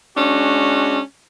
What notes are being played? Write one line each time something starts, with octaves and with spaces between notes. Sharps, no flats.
G#3 C#4 D4 F#4